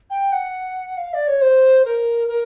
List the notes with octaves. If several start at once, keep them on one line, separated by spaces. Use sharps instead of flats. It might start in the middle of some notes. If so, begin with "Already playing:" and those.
G5
F#5
F5
D5
C#5
C5
A#4
A#4